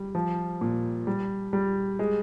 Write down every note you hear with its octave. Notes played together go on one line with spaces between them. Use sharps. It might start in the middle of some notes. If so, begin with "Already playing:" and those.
Already playing: G3
F3
A#2
G3
G3
G#3